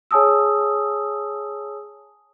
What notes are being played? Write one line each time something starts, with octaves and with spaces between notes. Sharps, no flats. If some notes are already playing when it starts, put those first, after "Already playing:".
G#4 C#5 G#5 A5 D#6 E6